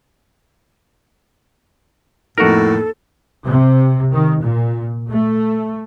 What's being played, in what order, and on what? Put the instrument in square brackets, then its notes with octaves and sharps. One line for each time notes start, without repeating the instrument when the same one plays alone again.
[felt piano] F2 A#3 D#4 [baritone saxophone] A2 [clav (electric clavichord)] F#4 A#4 [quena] A4
[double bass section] C3
D#3
A#2
A3